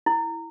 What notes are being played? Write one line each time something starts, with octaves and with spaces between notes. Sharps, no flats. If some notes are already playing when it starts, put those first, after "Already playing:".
E4